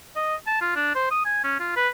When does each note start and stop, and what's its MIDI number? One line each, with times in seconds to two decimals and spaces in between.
0.16 0.35 75
0.47 0.59 81
0.61 0.74 65
0.76 0.95 62
0.95 1.08 72
1.11 1.25 87
1.25 1.41 80
1.44 1.55 61
1.60 1.72 65
1.76 1.88 71